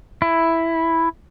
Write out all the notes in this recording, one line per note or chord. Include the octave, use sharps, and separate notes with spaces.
E4